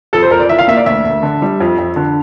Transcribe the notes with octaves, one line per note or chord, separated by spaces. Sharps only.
F2 A4
C5
F2 A#4
D5
E3 E5
F5
A#3 E5
D5
D2 E5
D2
D3
G3
F2
F2
D3